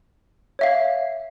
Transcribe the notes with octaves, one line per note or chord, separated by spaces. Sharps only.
C#5 E5 F5